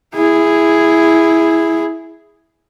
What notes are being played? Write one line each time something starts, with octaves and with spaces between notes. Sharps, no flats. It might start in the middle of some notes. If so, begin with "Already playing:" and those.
E4 G#4